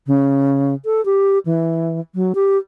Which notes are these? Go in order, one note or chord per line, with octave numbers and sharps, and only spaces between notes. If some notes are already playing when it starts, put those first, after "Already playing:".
C#3
A4
G4
E3
F#3
G4